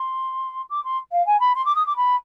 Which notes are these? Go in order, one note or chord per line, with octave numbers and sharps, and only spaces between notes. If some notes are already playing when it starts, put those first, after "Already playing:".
Already playing: C6
D6
C6
F5
G#5
B5
C6
D6
D#6
D6
B5